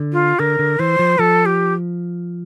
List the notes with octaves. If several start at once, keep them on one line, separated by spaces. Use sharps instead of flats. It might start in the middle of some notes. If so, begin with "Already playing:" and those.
Already playing: D3
F4
D3 A#4
D3
E3 C5
F3
F3 A4
G4